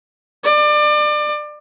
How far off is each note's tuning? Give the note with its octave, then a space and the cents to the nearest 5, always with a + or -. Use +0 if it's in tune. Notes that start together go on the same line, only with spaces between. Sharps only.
D5 +30